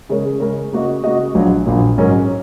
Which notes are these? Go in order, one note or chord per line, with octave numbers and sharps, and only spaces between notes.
C#3 G#3 C#4 A#4 C#5
C#3 G#3 C#4 A#4 C#5
C#3 A#3 F#4 D#5
C#3 A#3 F#4 D#5
A#1 A#2 F#3
A#1 A#2 F#3
G#2 F#3 C#4 A#4